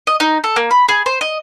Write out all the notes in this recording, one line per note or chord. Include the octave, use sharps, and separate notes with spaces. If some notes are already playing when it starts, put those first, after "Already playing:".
D#5
D#4
A4
A#3
B5
G#4
C5
D#5